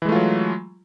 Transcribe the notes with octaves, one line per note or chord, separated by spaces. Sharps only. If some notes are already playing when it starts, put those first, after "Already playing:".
E3 F#3 G#3 A3 F4